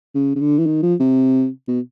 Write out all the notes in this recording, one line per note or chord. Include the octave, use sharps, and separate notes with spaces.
C#3
C#3
D3
E3
D#3
F3
C3
B2